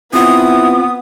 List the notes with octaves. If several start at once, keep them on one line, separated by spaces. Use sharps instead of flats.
B3 C4 E4 F4 D#6